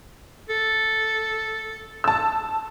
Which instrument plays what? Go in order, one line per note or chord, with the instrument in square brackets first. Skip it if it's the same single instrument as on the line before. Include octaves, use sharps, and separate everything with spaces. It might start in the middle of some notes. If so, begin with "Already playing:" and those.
[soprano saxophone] A4
[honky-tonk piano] A5 E6